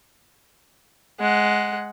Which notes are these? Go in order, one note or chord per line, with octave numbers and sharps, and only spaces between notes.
G#3 F#5